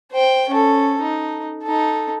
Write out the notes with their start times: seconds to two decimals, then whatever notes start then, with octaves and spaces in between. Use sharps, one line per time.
0.12 C5 G5
0.50 C#4 A4
1.01 D#4
1.63 D#4 A4